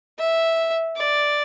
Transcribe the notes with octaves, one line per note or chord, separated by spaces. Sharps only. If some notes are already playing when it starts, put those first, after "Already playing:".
E5
D5